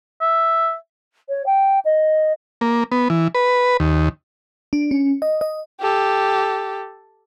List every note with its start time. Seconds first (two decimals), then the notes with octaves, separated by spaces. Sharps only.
0.21 E5
1.29 C#5
1.46 G5
1.85 D#5
2.61 A#3
2.92 B3
3.10 E3
3.35 B4
3.80 D#2
4.73 D4
4.91 C#4
5.22 D#5
5.41 D#5
5.81 G4 A4